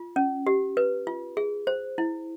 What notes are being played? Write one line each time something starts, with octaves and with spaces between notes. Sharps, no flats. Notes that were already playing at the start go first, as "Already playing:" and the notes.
Already playing: F4
C#4
G4
B4
F4
G#4
C5
E4